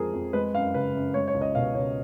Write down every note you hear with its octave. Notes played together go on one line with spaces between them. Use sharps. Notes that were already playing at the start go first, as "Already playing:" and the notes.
Already playing: F2 F3 G#3 G#4 A#4
F2
G#3 B4
F#2 F5
C#3 B4
F#2
G#3 C#5
C#5
C#2
D#5
B2 F5
C#2 C#5